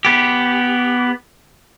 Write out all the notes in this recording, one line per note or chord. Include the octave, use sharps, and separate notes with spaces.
B3 G4